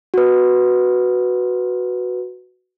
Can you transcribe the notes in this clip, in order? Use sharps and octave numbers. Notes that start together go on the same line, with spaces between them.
F#4 B4